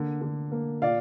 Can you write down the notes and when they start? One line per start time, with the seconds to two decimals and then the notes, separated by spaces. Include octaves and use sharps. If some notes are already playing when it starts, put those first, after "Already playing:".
Already playing: D3 A#3
0.22 D3
0.52 A#3
0.82 A#2 D5 F5